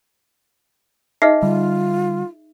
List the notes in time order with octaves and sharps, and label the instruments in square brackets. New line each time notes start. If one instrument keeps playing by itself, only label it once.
[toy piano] D#4 G#4 E5 [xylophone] D#5 F6 C7
[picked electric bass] D3 G3 [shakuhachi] F4